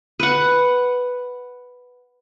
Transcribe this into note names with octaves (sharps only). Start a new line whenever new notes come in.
B4 F#5